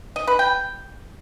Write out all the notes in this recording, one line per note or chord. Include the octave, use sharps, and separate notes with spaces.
D#5
B4
G5